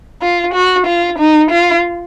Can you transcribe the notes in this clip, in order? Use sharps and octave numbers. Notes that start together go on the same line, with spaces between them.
F4
F#4
F4
D#4
F4